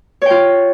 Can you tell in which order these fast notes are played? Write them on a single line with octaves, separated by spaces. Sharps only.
C#5 G5 F4